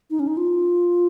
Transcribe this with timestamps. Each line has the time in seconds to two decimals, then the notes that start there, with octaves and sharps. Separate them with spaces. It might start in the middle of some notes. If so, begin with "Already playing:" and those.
0.10 D#4
0.20 C#4
0.27 D#4
0.37 F4